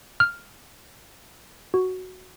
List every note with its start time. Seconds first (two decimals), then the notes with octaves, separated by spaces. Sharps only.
0.20 F6
1.74 F#4